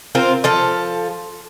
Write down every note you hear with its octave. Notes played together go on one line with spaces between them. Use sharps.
C4 F4 A#4 C5
F3 A4 F5